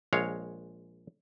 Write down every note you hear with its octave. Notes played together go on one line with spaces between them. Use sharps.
A#1 G#3 C#5 F5